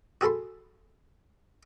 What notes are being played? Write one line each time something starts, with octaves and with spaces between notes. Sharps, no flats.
F#4 G#4 A4 B5 C6